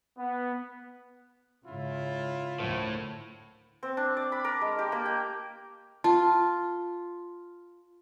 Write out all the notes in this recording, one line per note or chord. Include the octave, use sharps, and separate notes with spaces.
B3
G#2 C#3 E4 F4
D2 A2 A#4 C5
C4
D4
D5
B5
A#4
G#3
G4
A#3
G5
F4 A5